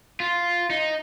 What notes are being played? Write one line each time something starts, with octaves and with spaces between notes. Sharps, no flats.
F4
D#4